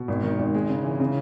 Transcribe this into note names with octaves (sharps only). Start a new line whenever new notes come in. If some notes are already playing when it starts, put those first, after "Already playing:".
Already playing: B2
G#1
D#3
G#1
G#3
C#3
E3
C#3